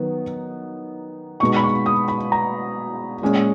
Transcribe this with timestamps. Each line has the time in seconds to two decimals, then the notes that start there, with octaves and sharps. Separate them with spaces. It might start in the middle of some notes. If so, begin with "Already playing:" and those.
Already playing: D#3 F#3 B3 D#4
1.40 B2 G#3 D#4 C#6
1.56 B5
1.63 C#6
1.86 D#6
2.08 B5
2.32 A#5
3.21 A#2 G#3 C#4